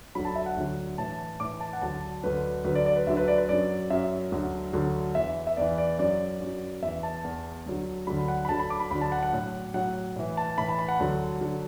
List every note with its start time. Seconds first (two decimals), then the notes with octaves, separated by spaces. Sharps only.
0.15 D2 D3 F#3 B5
0.25 A5
0.36 E5
0.46 F#5
0.57 D2 D3 F#3
0.98 A2 E3 A5
1.40 A2 E3 D6
1.61 A5
1.73 F#5
1.82 D2 D3 F#3 A5
2.24 D2 D3 F#3 B4
2.65 D2 D3 F#3 B4
2.75 D5
2.86 D5
2.96 B4
3.07 D2 D3 F#3 E5
3.17 B4
3.28 D5
3.38 B4
3.49 F#2 F#3 D5
3.90 F#2 F#3 E5
4.32 D2 D3 F#3
4.73 D2 D3 F#3
5.15 E2 E3 E5
5.47 E5
5.57 E2 E3 D5
5.78 D5
5.99 F#2 F#3 D5
6.40 F#2 F#3
6.82 E2 E3 E5
7.03 A5
7.24 E2 E3
7.66 D2 D3 F#3
8.07 D2 D3 F#3 B5
8.28 F#5
8.45 B5
8.49 D2 D3 F#3 A5
8.60 B5
8.70 D6
8.80 B5
8.91 D2 D3 F#3 B5
9.01 A5
9.12 F#5
9.23 F#5
9.33 A2 F#3
9.74 A2 F#3 F#5
10.16 A2 E3
10.37 A5
10.58 A2 E3 B5
10.68 A5
10.79 B5
10.88 F#5
11.00 D2 D3 F#3
11.41 D3 F#3